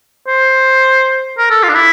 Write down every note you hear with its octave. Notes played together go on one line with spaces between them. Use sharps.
C5
A#4
A4
F4
D4
E4